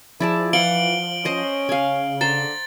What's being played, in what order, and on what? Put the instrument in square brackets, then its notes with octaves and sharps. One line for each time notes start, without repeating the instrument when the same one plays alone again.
[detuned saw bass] F3 [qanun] E4 D5 A5 [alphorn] G#4
[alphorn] E3 [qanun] F5 F#5 [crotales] D7 F#7 G7
[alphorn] C#4 [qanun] C5 D#5
[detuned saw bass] C#3 [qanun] F5 G#5
[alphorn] D3 [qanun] C5 A#5 [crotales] A6